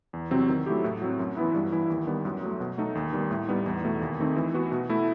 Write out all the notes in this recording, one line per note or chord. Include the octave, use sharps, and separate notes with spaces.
E2
C3 F#3 C4
D#3
F#3 A3 E4 G4
A2
F#3 C4
F#2
E3 B3 E4
G2
E3 B3 E4
D#2
D#3 G3 B3
F#2
F#3 A3
B2
A3 D#4 A4
D#2
D#3 G3 B3
A2
G3 B3 D#4
E2
B2 A3
D#2
D#3 A3 C4 D#4
E3
B3 F#4
B2
A3 E4